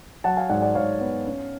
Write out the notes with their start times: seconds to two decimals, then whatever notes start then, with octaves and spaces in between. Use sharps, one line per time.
0.24 F#3 F#5 A5
0.37 F5 G#5
0.50 G#2 D5 F#5
0.62 D5 F#5
0.75 G#2 C#5 F5
1.01 B3
1.27 C#4